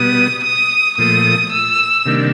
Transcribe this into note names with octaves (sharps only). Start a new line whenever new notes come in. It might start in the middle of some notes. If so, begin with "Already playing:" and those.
Already playing: B2 G3 B3 D#6
D#6
A#2 F3 A3 D#6
E6
C3 D#3 G3 A#3 D4